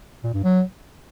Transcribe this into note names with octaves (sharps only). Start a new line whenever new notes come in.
A#2
G2
F#3